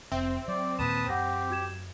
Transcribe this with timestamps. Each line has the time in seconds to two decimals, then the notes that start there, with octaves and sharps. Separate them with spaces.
0.12 F1 C4 E5
0.48 F#3 D5
0.79 D#2 A#2 B4 A5 D#6 E7
1.09 F#2 G4 F#5 A#6
1.50 F#4 G#6 E7